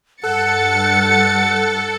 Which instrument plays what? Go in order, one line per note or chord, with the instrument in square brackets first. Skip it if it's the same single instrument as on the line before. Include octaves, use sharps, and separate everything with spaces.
[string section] G2 A6 C#7 [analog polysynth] A4 [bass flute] F#5 [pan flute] F#6